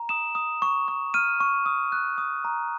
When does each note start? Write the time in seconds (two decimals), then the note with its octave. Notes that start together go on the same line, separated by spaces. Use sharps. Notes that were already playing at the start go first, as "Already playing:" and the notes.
Already playing: A#5
0.09 D#6 E7
0.35 D#6
0.62 C#6
0.88 C#6
1.14 F6 D#7
1.40 C#6
1.66 D#6
1.92 F#6
2.18 D#6
2.45 A#5